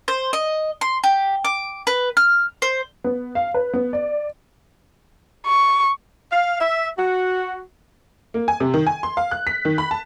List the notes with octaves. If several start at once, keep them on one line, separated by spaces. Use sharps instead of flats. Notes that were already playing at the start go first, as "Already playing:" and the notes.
C5
D#5
C6
G4
D6
B4
F6
C5
B3
F5
B4
B3
D5
C#6
F5
E5
F#4
A#3
G#5
C3
D#3
G#5
C6
F5
F#6
B6
D#3
B5
A5